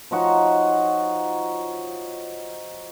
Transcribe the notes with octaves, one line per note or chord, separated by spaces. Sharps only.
F3 D#4 F#4 C#5